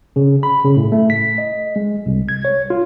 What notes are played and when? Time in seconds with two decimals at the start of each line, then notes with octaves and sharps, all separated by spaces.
0.16 C#3
0.43 B5
0.64 C#3
0.76 A2
0.92 A3
1.10 B6
1.38 D#5
1.76 G#3
2.06 C2
2.29 G#6
2.45 C#5
2.70 F4